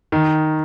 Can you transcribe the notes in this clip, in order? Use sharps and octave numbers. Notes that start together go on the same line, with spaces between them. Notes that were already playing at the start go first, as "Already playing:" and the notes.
D#3